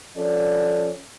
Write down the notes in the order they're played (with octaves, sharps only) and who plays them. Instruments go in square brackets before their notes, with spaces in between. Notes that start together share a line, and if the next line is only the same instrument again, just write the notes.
[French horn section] F3 C#4 A4 D5